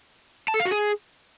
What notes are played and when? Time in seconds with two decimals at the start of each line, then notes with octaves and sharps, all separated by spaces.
0.48 A5
0.54 A4
0.60 F5
0.65 F#4
0.71 G#4